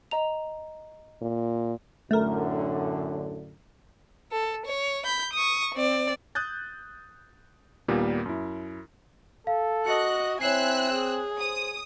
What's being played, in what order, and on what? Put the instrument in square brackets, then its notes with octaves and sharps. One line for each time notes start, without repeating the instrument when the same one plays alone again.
[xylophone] D#5 A#5 F7
[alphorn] A#2
[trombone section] F#2 A2 D3 [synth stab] A3 A#4
[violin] A4
C#5
B5 G6
C#6 D#6
C4 D5
[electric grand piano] D#6 F#6 G6 A6
D#2 A#2 G3 A#3 B3
F#2 E4
[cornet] A4 [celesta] F5
[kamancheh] F#4 D#5 [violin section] F#6 [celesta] C#7
[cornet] C4 [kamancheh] E4 G#5 [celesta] C#5 C7 [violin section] E6 F#6
[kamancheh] G#4
[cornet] C5 [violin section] D#6